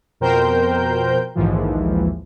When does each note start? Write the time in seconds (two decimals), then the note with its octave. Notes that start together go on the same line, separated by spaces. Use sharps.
0.20 F2 B2 A#4 C5 G5 G6
1.35 A#1 D#2 G#2 E3 F3